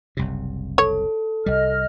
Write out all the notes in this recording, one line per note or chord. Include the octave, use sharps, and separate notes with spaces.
F#1 C2 C3
A4 C#5
C2 G3 D#5 F6